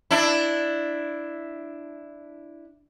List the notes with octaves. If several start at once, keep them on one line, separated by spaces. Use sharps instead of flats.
D4 E4